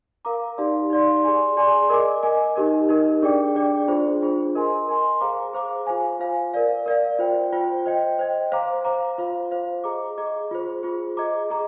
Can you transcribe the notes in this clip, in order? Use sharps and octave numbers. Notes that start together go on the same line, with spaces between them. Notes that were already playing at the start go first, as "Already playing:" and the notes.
A#4 F5 A#5 D6
D#4 G4 D5 F5 C6
D#4 G4 D5 F5 C6
G#4 D5 G#5 C6
G#4 D5 G#5 C6
A#4 D#5 G#5 D6
A#4 D#5 G#5 D6
D#4 G4 A#4 D#5
D#4 G4 A#4 D#5
D4 G#4 D5 G5 D6
D4 G#4 D5 G5 D6
D4 F4 G#4 C5
D4 F4 G#4 C5
A#4 D#5 G#5 C6
A#4 D#5 G#5 C6
G#4 C5 F5 A#5 D6
G#4 C5 F5 A#5 D6
F4 C5 F5 G#5
F4 C5 F5 G#5
A#4 D5 F5
A#4 D5 F5
F4 C5 G5
F4 C5 G5
C5 D#5 G5
C5 D#5 G5
C5 F5 A#5 D6
C5 F5 A#5 D6
F4 C5 F5
F4 C5 F5
G#4 D#5 A#5 D6
G#4 D#5 A#5 D6
F4 G#4 C5
F4 G#4 C5
G#4 D#5 A#5 D6
G#4 D#5 A#5 D6